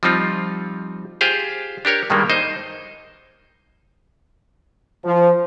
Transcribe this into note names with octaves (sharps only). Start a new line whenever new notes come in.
F3 G3 C4 D#4 F4
F4 G4 G#4 C5 F5
D4 G4 A#4 C#5
G2 D#3 G3 G#3 A#3
D#4 C5 D#5
F3